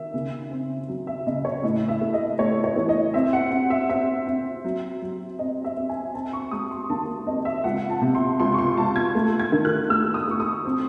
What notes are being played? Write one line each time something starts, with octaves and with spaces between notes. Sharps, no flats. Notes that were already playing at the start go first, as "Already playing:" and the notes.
Already playing: D#3 E5
C#3
C4
F#3
E5
C#3 D#5
C#5
A2 D#5
E5
A3
D#5
A3 C#5
C#5
E3
D#5
C4 E5
F#5
C4
E5
C4 E5
C4
F#3
F#3
C4 D#5
E5
C4
G#5
C4 A5
C#6
G#3 D#6
C6
D#2 A5
C4 D#5
E5
C#2 F#5
A5
C3
C6
C#2 C6
C#6
C6
C#2 A5
G#6
A3
G#6
D#3
F#6
A3 E6
D#6
A3 C#6
D#6
C4